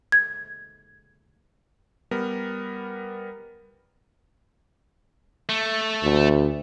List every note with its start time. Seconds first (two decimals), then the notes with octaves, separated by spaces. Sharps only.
0.12 G#6
2.11 G3 B3 A#4
5.49 A3
6.03 D2